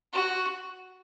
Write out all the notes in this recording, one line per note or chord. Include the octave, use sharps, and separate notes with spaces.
F#4